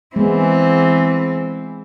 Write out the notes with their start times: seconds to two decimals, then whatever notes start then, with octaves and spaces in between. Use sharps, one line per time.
0.16 E3 G#3 B3 C4